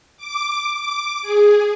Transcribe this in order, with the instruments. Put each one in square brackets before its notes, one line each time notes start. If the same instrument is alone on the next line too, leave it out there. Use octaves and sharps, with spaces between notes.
[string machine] D6
D6
G#4